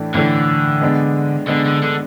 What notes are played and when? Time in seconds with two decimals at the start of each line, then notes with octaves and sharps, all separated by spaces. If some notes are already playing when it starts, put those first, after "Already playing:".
Already playing: A2 E3 A3 D4
0.14 A2 D3 E3 A3 D4 A4
0.82 G#3 B3 D4
1.48 D3 G#3 B3 D4
1.66 D3
1.83 D3